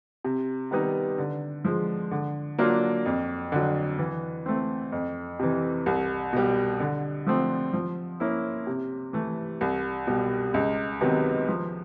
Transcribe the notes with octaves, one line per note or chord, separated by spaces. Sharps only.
C3
D#3 G3 B3 D#4
D3
F3 G#3
D3
F#3 A#3 D4 F4
F2
D3 F#3
E3
A3 C4
F2
C3 E3
C2
B2 G3
D3
F3 A3 C4
F3
A#3 C#4 E4
C3
E3 A3
C2
B2 G3
C#2
C3 D#3 F#3 B3
F3